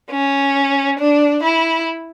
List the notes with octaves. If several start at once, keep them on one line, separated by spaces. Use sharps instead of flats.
C#4
D4
E4